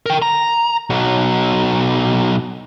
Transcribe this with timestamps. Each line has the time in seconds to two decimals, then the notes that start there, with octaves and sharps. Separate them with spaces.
0.06 A#4 G5
0.22 A#5
0.90 B1 F#3